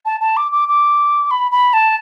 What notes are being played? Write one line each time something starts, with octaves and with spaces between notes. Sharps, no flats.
A5
A5
D6
D6
D6
B5
B5
A5